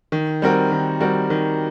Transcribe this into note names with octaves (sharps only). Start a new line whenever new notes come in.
D#3
G3 C4 F#4 A#4
D#3
G3 C4 F#4 A#4
D#3